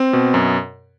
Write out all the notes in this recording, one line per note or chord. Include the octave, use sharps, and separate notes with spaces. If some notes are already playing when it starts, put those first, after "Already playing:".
Already playing: C4
B2
F#2